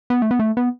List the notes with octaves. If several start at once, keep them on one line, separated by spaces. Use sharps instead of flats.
B3
A3
B3
A3
B3